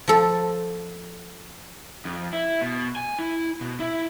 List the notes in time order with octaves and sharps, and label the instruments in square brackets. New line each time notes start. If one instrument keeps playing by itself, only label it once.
[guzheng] F3 A4
[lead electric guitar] F2
E4
B2
G#5
E4
B2
E4